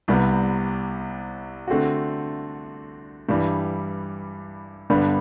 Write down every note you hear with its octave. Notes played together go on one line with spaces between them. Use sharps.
C2 C3 G3 B3
D3 A3 C4 F#4
G2 E3 G3
G2 D3 G3 B3